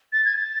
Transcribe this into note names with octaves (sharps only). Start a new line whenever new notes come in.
A6
G#6
A6